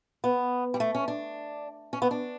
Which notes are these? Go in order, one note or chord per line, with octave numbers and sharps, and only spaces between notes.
B3
G3
A3
C#4
D4
C#4
B3
D4